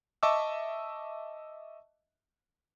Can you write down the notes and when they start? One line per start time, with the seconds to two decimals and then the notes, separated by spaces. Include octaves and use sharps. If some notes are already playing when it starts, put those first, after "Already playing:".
0.23 D#5 E5 A5 C#6 D6 E6